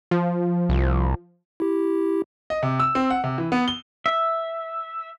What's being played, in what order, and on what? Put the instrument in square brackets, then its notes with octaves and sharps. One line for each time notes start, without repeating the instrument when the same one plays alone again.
[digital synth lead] F3
[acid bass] C2
[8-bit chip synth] E4 G4
[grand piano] D#5
C3
E6
C4
F#5
C3
E3
B3
G7
[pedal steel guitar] E5